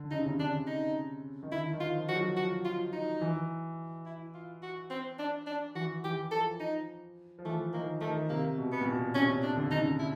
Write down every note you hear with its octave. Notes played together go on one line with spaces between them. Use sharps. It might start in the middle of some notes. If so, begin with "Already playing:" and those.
Already playing: D3
C#3 D#4
C3
C#3
D3 D4
D#4
D#3
D3 E4
D#3
F4
F3
F3 F#4
F#3
F3 F#4
F4
D#4
E3
E4
F4
F#4
C4
D4
D4
E3 F#4
E3 G4
F3 A4
D#4
F3
E3 A3
D#3 A#3
D#3 A3
C3 A#3
B2
B3
A#2
B2
C3 C#4
D4
D3
D3 D#4
C#3
E4